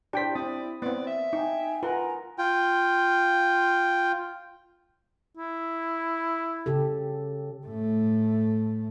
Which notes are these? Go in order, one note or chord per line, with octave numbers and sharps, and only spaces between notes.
D4 E4 G4 C5 G5 B6
C4 D5 D#6
B3 C4 D5
E5
D#4 G5 G#5
F4 A#4 B4 F#5 G#5 A#5
F4 G5
E4
C#3 G4 A4
A2 A3